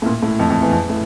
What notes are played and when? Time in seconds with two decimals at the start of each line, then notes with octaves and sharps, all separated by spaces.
0.02 A2
0.06 A#2
0.22 A2
0.39 F2
0.50 F2
0.62 E2
0.73 F2
0.89 A2